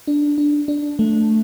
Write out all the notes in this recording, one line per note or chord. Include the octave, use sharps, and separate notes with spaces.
D4
D4
D4
A3